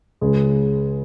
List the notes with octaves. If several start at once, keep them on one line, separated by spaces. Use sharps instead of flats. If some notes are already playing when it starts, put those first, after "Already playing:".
C#2 C#3 G#3